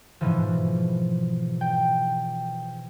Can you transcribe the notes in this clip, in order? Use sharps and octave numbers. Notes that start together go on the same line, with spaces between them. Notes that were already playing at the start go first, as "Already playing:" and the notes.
G#2 B2 E3 F3
G5